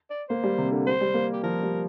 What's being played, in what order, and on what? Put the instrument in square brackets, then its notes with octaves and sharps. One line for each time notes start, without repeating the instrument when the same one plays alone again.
[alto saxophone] D5
[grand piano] A#3 [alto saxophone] C5
[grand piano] G3
C3
D3
[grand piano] G3 [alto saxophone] C5
[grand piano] G3
A#3
[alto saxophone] G4
[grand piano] F3 [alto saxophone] A#4
[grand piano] G3